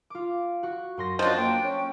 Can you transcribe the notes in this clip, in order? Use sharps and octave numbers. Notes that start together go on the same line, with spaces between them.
F4 D6
F#4 C#6
F#2 C6 A#6
F3 C#4 D4 F#4 C5 D#5 C6 G6
A#3 G5
C#4